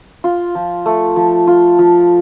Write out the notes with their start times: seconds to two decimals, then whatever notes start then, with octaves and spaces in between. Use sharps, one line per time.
0.24 F4
0.55 F3
0.86 A3
1.16 F3
1.47 F4
1.79 F3